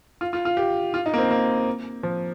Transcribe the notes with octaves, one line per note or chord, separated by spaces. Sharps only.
F4
F4
F4
G4
F4
D#4
A#3
C4
A#3
F3